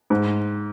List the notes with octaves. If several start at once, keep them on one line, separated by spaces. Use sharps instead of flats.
G#2